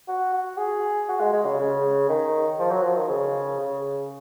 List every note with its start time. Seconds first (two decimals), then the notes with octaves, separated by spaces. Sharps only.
0.08 F#4
0.33 F#4
0.57 G#4
1.08 F#4
1.20 G#3
1.33 G#3
1.45 C#3
1.59 C#3
2.09 D#3
2.59 F3
2.71 F#3
2.83 F3
2.97 D#3
3.09 C#3
3.59 C#3